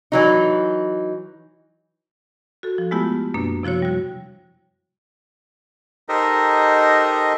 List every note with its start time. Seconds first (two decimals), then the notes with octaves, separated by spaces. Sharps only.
0.12 E3 F#3 D#4
2.63 F#4 A4
2.78 F3
2.91 G#3 A3 B3 E4 F4 G4
3.34 F#2 B2 A#3 D4
3.63 C3 F3 E4 F#4 C#5
3.82 G3 F#4
6.09 D#4 G4 A4 A#4 C5 D#5